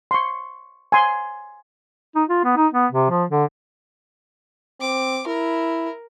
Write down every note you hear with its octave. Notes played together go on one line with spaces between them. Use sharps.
C6 C#6
G#5 C6
D#4
F4
B3
D#4
B3
C3
F3
D3
C4 D6
E4 A#4